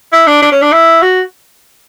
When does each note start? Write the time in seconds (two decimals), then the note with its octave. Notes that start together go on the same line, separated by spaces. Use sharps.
0.12 E4
0.27 D4
0.42 D4
0.52 C#4
0.62 D4
0.72 E4
1.02 F#4